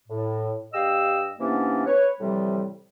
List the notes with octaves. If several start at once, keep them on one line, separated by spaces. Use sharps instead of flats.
A2
G2 G4 D#5 F5 E6
C3 E3 A#3 B3 C#4 D4
B4 C#5
A2 C3 E3 F3 G3